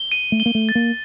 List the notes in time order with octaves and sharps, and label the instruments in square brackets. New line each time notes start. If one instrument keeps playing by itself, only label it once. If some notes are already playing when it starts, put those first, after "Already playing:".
Already playing: [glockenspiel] G7
D#7
[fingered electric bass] A3
[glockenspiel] G7
[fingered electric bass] A#3
A3
[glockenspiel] A6
[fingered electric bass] A#3